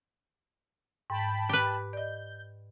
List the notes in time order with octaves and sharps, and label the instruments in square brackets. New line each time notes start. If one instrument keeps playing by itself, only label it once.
[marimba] G#2 [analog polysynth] G5 A5 B5
[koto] G4 B4
[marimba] D5 D#5 [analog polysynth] G6